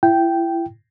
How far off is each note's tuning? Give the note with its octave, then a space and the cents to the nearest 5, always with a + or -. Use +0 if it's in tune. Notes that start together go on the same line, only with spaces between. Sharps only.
E4 +30 G5 -5